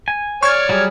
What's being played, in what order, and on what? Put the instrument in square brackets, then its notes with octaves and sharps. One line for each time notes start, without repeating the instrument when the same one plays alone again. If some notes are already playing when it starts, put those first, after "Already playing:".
[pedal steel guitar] G#5
[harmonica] C#5 D5 [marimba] C#6 [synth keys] F6 G#6
[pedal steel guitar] F#3 G3 G#4